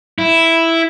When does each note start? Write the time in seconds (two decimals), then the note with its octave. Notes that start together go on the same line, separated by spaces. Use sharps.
0.19 E4